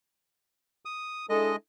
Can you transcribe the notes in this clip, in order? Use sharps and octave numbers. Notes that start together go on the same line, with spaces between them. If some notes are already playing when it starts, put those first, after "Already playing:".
D#6
G#3 D4 E4 A4 D#5